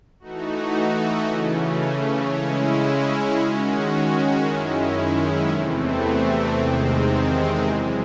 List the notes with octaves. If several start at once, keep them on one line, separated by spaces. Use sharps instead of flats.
E3 A3 D#4 F#4
C#3 E3 A3 C#4
C#3 G#3 C#4 E4
D#3 G#3 C#4 F#4
F#2 D#3 G#3 C#4 E4
E2 C3 E3 A3 C4
E2 C3 D#3 G#3 C4
F#2 E3 G#3